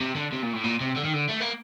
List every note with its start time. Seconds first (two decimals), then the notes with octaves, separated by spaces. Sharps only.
0.01 C3
0.16 D3
0.33 C3
0.43 A#2
0.54 A2
0.64 A#2
0.81 C3
0.96 D3
1.04 D#3
1.13 D3
1.29 A3
1.40 A#3